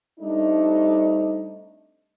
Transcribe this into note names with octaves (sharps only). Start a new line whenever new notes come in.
G3 A3 C4 D4 D#4